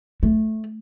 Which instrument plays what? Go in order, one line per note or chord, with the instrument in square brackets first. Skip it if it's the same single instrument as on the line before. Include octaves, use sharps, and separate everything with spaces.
[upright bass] A3